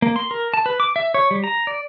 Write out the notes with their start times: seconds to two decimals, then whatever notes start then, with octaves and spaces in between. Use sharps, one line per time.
0.02 A#3
0.16 C6
0.31 A#4
0.54 A5
0.66 B4
0.80 D6
0.96 E5
1.14 C#5
1.31 G3
1.44 A#5
1.67 D5